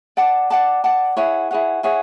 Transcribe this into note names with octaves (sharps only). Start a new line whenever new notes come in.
D5 F#5 A5 D6
D5 F#5 A5 D6
D5 F#5 A5 D6
E4 G#4 C#5 F#5
E4 G#4 C#5 F#5
E4 G#4 C#5 F#5